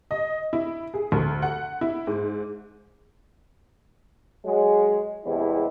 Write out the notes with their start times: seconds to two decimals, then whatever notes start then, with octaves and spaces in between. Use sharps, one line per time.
0.11 D#5
0.53 E4
0.94 G#4
1.12 D2
1.42 F#5
1.81 E4
2.07 G#2
4.45 F#3 G#3
5.25 E2 C3 G3 G#3 E4